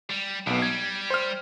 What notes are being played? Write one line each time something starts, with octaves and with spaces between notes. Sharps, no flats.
G3
B1 B2 B3
G3 G#6
C5 F6